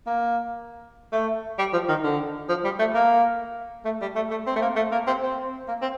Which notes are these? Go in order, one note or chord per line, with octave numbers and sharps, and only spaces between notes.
A#3
A3
G3
F3
D#3
D3
F3
G3
A3
A#3
A3
G3
A3
A3
C4
A3
A#3
A3
A#3
C4
C4
A#3
C4